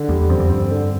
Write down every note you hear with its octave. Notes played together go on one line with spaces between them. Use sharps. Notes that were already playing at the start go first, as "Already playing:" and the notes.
Already playing: D3
E2 G3
F2 C4
F2
G2 C4
D3